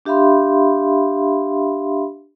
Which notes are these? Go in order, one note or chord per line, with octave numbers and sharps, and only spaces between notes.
D4 G4 E5 F5 B5 C6